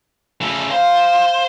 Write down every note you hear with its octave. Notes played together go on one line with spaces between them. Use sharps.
C#3 A3
C5 F5